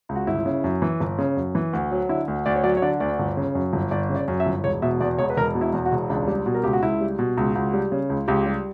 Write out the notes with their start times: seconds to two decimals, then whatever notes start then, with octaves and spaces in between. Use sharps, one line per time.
0.09 C#2
0.15 F#4
0.27 G1 E4
0.46 C#3
0.64 F#2
0.82 E3
1.00 G1
1.18 C#3
1.37 F#2
1.55 E3
1.73 D2
1.91 F#3
2.09 D3 E4
2.28 D2
2.46 D2 D5
2.56 C#5
2.64 F#3 D5
2.77 C#5
2.82 D3 D5
3.00 D2 D5
3.19 G1
3.37 C#3
3.55 F#2
3.73 G1
3.91 G1 D5
4.09 C#3
4.15 D5
4.28 F#2
4.40 E5
4.46 G1
4.64 E1 C#5
4.82 B2 E5
5.00 E2 D5
5.18 E1 C#5
5.30 B4
5.37 E1 A#4
5.55 B2
5.61 E4
5.73 E2
5.85 F#4
5.92 E1
6.10 C#2 D4
6.28 G3
6.46 B2
6.54 A#4
6.64 C#2 G4
6.73 F#4
6.83 C#2 E4
7.01 G3
7.19 B2
7.37 C#2
7.55 C#2 F#4
7.74 G3
7.92 C#3
8.09 C#2
8.28 C#2 G4
8.46 G3